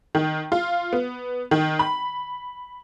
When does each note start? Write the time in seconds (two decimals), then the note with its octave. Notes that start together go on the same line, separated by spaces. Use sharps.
0.15 D#3
0.52 F4
0.93 B3
1.51 D#3
1.79 B5